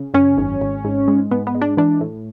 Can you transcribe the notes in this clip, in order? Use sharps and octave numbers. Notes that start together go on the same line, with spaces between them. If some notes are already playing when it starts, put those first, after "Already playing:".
Already playing: C#3
F#2 C#4
G#1
G#1
G#2
G#3
G#2 B3
B3
G#3
D4
E3 D4
A2